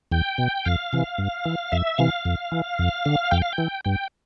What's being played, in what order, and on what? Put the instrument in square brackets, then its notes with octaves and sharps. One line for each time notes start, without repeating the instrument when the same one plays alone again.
[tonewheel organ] E2 G5
B2
F2 F5
C3 E3
G2
E3
F2 E5
C3 E3 F5
F2
E3
F2
D3
F2 G5
F5
G5
E3
G2 G5